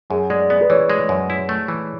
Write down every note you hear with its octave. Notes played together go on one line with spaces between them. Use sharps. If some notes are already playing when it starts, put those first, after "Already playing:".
F#2 G#4
G#3 D5
B3 D5
B4
E3 C#5
G#3
F#2
E4
A3
E3